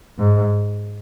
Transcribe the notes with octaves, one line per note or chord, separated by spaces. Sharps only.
G#2